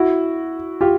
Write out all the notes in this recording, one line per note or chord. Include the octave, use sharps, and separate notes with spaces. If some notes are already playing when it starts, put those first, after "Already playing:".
Already playing: E4 F#4
F4 G4